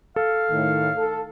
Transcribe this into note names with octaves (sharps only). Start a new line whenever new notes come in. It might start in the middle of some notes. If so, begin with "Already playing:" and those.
A4 F5
A2 D#3
A4